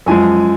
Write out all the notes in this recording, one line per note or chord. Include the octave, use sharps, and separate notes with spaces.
F#2 F3 G#3 G#5